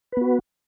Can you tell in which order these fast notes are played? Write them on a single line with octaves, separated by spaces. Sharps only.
B4 B3 F#4